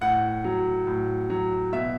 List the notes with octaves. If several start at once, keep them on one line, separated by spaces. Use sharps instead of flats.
A2 F#5
F#3
A2
F#3
B2 E5